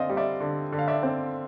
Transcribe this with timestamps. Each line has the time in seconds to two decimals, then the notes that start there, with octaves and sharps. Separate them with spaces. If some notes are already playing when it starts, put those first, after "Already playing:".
Already playing: D3 C4 C5 D5 D#5 F5
0.10 G3
0.17 D5 E5
0.40 D3
0.72 D3
0.79 F5
0.88 D5 E5
1.03 C4